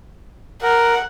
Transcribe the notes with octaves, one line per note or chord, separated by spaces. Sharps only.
A#4 F#5